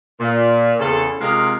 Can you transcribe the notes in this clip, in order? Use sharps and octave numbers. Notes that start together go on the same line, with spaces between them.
A#2
E2 C#3 C4 A4
C3 G#3 F4 A#4 D#5 F5